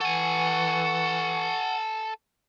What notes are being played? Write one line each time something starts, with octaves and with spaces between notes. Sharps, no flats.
E3 A4 F#5 G#5 C#6